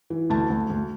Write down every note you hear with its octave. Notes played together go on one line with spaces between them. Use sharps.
E3
D2 A5
D2
D2